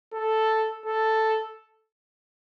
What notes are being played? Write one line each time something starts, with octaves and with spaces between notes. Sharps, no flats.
A4
A4